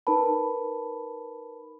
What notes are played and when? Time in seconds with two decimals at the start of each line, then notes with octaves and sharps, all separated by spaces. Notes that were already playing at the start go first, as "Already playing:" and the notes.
0.07 D#4 A#4 B4 A5 B5